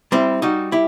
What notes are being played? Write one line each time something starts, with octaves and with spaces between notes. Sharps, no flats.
G3 C4 E4
G3 D#4 F#4
E4 G4